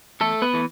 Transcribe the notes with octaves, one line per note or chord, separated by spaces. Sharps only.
E2 A3 A4
B3 B4
E3 A3